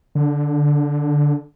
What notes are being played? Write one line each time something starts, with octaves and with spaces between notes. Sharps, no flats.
D3